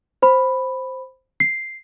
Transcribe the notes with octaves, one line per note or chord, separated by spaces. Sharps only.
C5 B5
C7